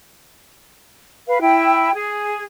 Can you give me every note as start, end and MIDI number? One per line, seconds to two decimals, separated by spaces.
1.27 1.38 71
1.27 1.38 77
1.41 1.92 64
1.41 1.92 79
1.94 2.43 68